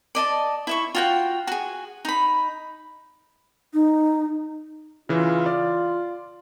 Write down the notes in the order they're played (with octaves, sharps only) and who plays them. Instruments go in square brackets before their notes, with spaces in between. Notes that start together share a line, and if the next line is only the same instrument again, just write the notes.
[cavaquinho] D5 D#5 A5
E4 E5 C#6
F4 F#4 G5
F#4 G#4
D#4 B5
[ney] D#4
[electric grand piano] C#3 E3 [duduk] F4
[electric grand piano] D5